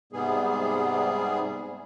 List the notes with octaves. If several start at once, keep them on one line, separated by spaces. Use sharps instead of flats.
G#2 C3 G3 B3 G#4